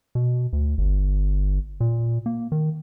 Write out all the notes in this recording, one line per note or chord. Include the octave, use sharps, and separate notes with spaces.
B2
D2
G1
A#2
A#3
D#3